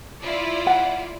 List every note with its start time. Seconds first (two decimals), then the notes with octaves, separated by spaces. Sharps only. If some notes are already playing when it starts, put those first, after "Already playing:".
0.20 E4 F4 D5
0.67 F#5